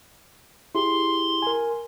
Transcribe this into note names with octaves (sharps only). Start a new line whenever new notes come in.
E4 G4 G#4 C6
A#4 G#5